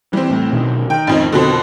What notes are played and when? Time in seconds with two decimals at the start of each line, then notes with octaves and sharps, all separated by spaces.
0.13 E3 G3 C4
0.30 A2
0.52 B1 B2 D#3
0.90 D#3 G5
1.07 A1 F2 D#4
1.32 F2 B2 D3